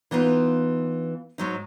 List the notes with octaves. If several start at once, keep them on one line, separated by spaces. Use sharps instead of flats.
E3 B3 D#4 F4
G#2 F#3 D#4